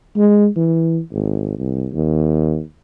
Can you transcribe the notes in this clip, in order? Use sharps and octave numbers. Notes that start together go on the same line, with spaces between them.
G#3
E3
G#1
C2
D#2